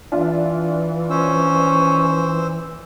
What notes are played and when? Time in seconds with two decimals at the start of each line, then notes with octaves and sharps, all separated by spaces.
0.12 E3 D4 F4 E5
1.10 C#4 C5 E6